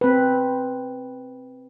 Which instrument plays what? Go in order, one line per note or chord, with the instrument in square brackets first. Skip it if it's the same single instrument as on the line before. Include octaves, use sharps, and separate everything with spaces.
[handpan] C4 B4